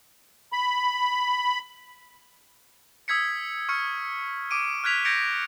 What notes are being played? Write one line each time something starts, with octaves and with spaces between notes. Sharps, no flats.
B5
D#6 E6 G#6 B6 C#7
C#6 F6 C#7
D6 D7 D#7
F6 F#6 G#6 B6 F7
G6 G#6 A#6 C#7 D7 F7